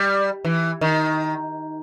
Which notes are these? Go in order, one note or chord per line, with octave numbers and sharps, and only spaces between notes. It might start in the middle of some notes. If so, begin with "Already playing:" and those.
Already playing: G3
E3
D#3